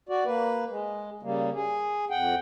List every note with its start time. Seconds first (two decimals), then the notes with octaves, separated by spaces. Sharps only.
0.09 F#4 D5
0.25 A#3 B4
0.70 G#3
1.23 C#3 G3 A#3
1.54 G#4
2.11 F2 F#5 G5